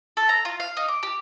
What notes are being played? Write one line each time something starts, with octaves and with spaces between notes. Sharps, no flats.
A4
A#5
F4
F5
D#4
D6
G4